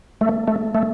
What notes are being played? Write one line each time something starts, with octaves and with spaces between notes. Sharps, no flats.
A3
A3
A3